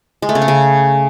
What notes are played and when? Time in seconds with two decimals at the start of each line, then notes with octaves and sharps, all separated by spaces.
0.22 G#3
0.29 A3
0.35 C#3
0.42 C#4
0.48 C#3